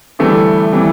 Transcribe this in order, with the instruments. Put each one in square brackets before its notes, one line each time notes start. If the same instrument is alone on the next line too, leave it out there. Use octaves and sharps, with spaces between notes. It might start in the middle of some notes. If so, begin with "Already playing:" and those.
[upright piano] D2 C3 E3 G3 [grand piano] A3
[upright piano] C3 E3 G3